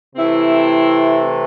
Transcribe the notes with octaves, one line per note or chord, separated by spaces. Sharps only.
C3 E3 A3 C4 E4